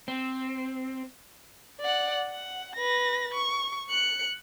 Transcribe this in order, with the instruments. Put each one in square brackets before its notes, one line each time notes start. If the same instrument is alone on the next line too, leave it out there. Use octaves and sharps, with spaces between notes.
[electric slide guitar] C4
[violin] D5 F#5
F#5
B4 A#6
C#6
F#6 C#7